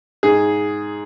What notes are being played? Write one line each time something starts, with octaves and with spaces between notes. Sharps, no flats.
G#2 G#4